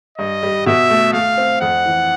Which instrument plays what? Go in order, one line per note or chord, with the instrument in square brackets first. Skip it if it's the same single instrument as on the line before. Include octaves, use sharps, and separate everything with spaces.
[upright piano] G2 [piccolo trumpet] D#5
[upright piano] G3
[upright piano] B2 [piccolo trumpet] E5
[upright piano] A3
[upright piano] A3 [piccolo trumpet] F5
[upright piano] C4
[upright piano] F2 [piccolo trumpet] F#5
[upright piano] E3